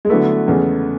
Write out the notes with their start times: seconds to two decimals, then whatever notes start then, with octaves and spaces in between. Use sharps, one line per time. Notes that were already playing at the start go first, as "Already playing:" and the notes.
0.05 G#3
0.09 D3 F#3 A3 B3 E4 B4
0.47 E2 C#3 G#3 B3